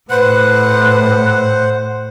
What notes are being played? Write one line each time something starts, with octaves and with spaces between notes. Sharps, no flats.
A2 B4 C5 F#5 F#6